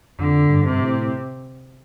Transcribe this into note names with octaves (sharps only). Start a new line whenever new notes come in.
F2 D3
G2
G2 C3
A2